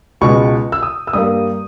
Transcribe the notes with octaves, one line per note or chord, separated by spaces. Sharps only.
C#2 B2 G#3 C#6
E6
D#6
E6
G2 G3 A#3 D#6